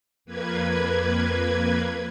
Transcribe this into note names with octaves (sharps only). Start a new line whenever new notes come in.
F2 A#3 B4 G#6